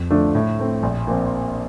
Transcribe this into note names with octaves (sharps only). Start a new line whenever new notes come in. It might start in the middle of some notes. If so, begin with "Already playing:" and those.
Already playing: F2
D3 F3 A3 D4
A2
A3 C4
A#1
A#2 F3 C4